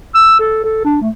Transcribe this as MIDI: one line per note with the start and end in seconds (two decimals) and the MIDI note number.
0.15 0.39 88
0.39 0.62 69
0.64 0.84 69
0.85 0.99 62
1.01 1.10 57